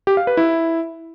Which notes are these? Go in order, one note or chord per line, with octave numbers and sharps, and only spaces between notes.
G4
F5
B4
E4